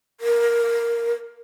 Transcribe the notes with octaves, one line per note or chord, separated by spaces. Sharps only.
A#4